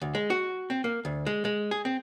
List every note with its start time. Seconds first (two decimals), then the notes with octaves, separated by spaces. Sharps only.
0.01 D2
0.15 G#3
0.30 F#4
0.70 C4
0.84 A#3
1.05 D2
1.26 G#3
1.45 G#3
1.71 G#4
1.85 C4